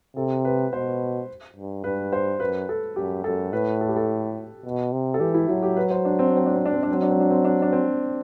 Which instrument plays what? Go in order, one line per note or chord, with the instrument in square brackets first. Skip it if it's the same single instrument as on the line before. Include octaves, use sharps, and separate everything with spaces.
[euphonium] C3 [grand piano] A4
[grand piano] B4
[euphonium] B2 [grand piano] C5
[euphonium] G2
[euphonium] G2 [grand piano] B4
[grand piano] C5
[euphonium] F#2 [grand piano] B4
[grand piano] A4
[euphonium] F#2 [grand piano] G4
[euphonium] F#2 [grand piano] A4
[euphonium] A2 [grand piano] B4
[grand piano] A4
G4
A4
[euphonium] B2
C3
[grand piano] A4
[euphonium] E3 [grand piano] G4
[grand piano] E4
[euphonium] F#3 [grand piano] E4
[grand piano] G4
B4
C5
D4
C4
D4
C4
D4
C4
D4
C4
D4
[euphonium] F#3 [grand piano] C4
[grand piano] D4
C4
D4
C4
D4
D4
C4